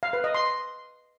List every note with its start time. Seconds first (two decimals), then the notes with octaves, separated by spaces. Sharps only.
0.03 F5
0.13 B4
0.24 D#5
0.35 C6